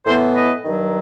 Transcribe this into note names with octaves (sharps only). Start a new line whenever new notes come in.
A2 E3 B3 A4 C5
B4 D#5
G2 D#3 F#3